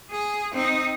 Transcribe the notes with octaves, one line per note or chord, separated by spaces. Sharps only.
G#4
C4 D#4